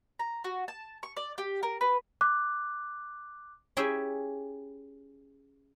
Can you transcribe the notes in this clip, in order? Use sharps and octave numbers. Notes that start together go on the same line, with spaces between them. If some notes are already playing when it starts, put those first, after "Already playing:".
A#5
F#4
A5
C#6
D5
G4
A#4
B4
D6 F#6
C#4 E4 G4 G#4 E5 G5